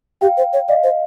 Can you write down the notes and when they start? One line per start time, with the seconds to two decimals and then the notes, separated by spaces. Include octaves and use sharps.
0.21 G4 F5 G5
0.37 C5
0.53 C#5
0.68 D5 D#5 F5
0.83 C5